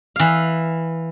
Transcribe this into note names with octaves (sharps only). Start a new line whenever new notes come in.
E3 F5